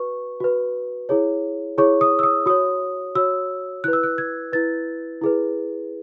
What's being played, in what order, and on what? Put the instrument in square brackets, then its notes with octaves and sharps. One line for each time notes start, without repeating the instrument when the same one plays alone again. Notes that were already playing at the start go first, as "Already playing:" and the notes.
Already playing: [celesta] F#4 B4 C#6
F#4 B4
E4 G#4 C#5
E4 G#4 C#5 C#6
D#6
E6
D#6
F#4 C#5 D#6
F#4 C#5 E6
E4 B4 F#6
E6
F#6
G#6
E4 B4 A6
E4 G#4 B4